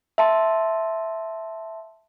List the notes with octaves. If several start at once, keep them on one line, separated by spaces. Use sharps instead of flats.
E5 F5 A5 C6